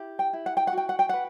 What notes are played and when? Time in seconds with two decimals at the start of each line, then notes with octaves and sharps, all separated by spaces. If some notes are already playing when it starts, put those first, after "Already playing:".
Already playing: E4 G4
0.19 G5
0.33 E4
0.46 F#5
0.57 G5
0.67 F#5
0.73 F#4 G5
0.89 F#5
0.99 G5
1.09 B4 F#5